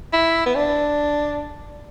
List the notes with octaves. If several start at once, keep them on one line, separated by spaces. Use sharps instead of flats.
E4
B3
D4